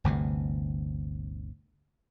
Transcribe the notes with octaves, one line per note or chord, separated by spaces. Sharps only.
G1 D2 C3